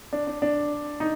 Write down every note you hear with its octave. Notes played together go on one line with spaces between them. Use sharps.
D4
D4
D4
D#4